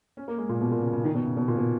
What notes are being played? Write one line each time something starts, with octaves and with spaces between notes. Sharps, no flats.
C#4
A#3
G#3
A#2
B2
A#2
C#3
C#3
D#3
B2
C#3
B2
A#2
B2